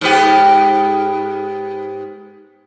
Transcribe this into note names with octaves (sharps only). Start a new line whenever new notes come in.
G#2 B3 G4